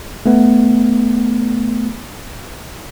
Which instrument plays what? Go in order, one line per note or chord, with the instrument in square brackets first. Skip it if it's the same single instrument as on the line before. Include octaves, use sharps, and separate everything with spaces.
[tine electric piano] A3 B3